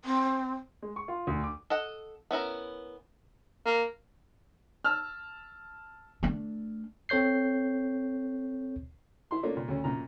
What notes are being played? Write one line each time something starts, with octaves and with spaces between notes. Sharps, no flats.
C4
G#3
C#6
F4
D2
D6
A4 D#5 F#5
B3 C#4 E4 A#4
A#3
A5 E6 F6
A3 D4
C4 A4 C#5 G6 C7
E4 C6
A3 A#3 C#4 D4 F4 A4
A#2
D2 C#3 C#4
F#2 A#2 A#5